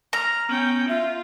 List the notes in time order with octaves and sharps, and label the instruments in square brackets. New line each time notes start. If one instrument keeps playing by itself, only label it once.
[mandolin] A#5 [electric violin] F6
[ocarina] B3 [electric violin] C#4 G5
[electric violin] F4 [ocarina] E5